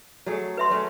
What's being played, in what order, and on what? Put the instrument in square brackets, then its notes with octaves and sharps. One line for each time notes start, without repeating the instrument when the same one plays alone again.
[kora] F#3 A3 G#4
[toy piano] B4 E5 C6
[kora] F#3 A3 C#4